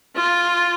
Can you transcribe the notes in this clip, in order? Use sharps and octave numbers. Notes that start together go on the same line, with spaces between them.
F4